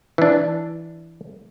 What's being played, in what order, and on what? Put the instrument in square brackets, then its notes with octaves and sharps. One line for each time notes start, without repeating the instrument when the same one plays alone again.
[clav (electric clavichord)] E3 D4